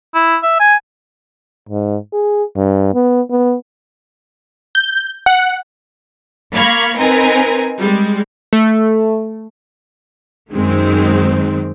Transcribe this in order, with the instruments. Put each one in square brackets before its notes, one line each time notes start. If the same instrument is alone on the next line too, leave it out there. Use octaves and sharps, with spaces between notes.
[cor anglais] E4
E5
G#5
[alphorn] G#2
G#4
G2
B3
B3
[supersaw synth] G6
F#5
[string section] A#3 F5 B5 C#6 F6 G#6
C4 D#4 A#4 B4 G#5 A#5
G3 G#3
[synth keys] A3
[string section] F#2 D#3 G#3 C4